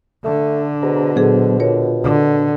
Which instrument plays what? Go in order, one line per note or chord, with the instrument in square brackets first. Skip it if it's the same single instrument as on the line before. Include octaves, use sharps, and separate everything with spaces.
[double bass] D3 [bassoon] A3
[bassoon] B2 [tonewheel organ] G#4 C5 A#5
[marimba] A#2 G#4 A4 [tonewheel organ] F#3 B3 C5
[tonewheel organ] F4 [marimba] A#4 C#5
[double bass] D3